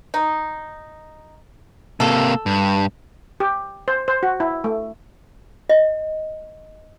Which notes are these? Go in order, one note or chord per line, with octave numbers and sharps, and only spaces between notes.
D#4
C3 A#3 A4
G2
G4
C5
C5
F#4
E4
A3
D#5